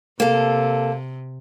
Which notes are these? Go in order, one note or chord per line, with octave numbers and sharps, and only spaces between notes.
C3 A#3 A4